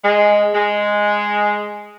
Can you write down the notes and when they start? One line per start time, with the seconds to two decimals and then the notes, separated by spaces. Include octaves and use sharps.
0.04 G#3
0.55 G#3